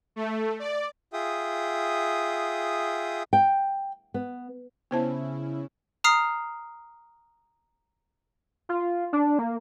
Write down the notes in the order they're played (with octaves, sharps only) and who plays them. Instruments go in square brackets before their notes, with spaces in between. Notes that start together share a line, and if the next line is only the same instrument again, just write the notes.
[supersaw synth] A3
D5
[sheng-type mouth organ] F4 G#4 E5 G5 D#6
[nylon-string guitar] G5
B3
[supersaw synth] C#3 C#4 E4 [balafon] B3 C5 A5
[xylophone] A#5 D#6 F6 C7
[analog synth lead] F4
D4
A#3